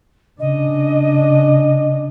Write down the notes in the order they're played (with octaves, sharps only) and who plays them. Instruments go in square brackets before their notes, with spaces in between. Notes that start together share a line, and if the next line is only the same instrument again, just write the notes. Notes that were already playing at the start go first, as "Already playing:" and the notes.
[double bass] C#3 D4 [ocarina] D#5